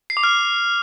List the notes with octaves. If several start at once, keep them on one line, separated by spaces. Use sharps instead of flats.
C7
D6
F6